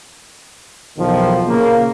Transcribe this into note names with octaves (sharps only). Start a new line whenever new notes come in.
B1 E2 D#3 F3
A#2 C#3 A#3